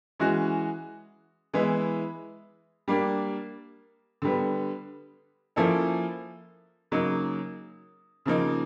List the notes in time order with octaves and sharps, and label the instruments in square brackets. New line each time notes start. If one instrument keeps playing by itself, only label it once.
[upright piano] E3 G#3 C#4 F#4
E3 G#3 B3 E4
G3 A#3 D4
D3 G3 B3
F3 A#3 C#4 E4 A4
C#3 F#3 A#3 D#4
C#3 F3 A#3 D#4